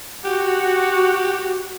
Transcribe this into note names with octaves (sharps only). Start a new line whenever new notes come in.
F#4 G4